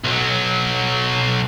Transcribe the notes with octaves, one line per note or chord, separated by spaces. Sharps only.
B1 F#3